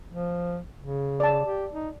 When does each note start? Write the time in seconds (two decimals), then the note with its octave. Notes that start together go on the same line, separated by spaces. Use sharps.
0.12 F3
0.79 C#3
1.20 D5 A5
1.45 G4
1.73 D#4